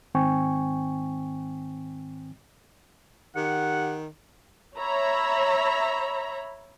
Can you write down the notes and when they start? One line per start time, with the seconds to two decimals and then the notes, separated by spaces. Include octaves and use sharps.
0.14 G#2 D#3 C4 G5 G#5 C#6
3.36 D#3 G4 F#5
4.77 C#5 E5 A#5 B5